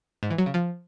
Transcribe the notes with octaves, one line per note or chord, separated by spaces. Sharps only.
G#2
E3
F#3
C#3
F3